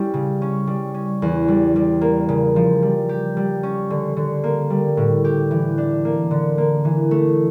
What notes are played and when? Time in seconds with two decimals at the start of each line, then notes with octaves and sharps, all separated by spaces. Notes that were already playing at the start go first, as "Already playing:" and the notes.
Already playing: G3 C#4 E4
0.14 C#3
0.42 C#4
0.67 G3
0.94 C#4
1.22 E2
1.48 G3
1.76 G3
2.01 A#3
2.29 C#3
2.56 F3
2.83 G3
3.09 G4
3.37 G3
3.63 C#4
3.90 D3
4.17 D3
4.44 A#3
4.70 G3
4.97 A2
5.24 G4
5.51 E3
5.78 D4
6.05 A#3
6.31 D3
6.58 A#3
6.85 E3
7.11 A3